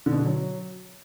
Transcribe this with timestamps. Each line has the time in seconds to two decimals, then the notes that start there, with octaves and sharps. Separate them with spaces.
0.06 D3
0.13 B2
0.19 D3
0.25 F#3